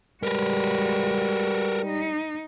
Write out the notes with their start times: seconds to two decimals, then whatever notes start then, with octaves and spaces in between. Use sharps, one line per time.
0.23 G3 G#3 F#4 A#4 B4
1.85 D#4